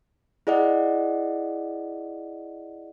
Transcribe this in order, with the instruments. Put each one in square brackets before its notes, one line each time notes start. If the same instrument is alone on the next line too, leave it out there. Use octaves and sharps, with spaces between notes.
[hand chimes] E4 G#4 D5 D#5 F#5